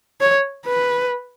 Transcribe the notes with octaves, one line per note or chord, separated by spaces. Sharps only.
C#5
B4